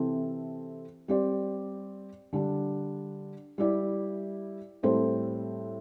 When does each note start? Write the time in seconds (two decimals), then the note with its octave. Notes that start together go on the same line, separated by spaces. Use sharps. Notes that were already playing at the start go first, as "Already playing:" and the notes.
Already playing: C3 E3 C4 A4
1.08 G3 C4 G4 D5
2.33 D3 G3 D4
3.58 G3 E4 G4 D5
4.83 A2 G3 C4 A4 C5